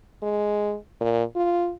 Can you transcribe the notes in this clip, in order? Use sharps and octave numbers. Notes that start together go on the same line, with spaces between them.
G#3
A#2
F4